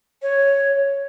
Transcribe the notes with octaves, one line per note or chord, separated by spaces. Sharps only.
C#5